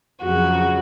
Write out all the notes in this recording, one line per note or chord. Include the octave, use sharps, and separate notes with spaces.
F2 C#3 F#3 F#4